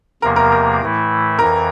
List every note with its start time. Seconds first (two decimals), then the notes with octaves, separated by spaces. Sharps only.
0.22 E2 C3 F3 A#3 A#4
0.36 A#4
0.52 A#4
0.81 A2 E3 A3 E4
1.39 F2 E3 A#4